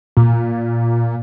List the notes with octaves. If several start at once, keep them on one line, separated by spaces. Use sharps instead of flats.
A#2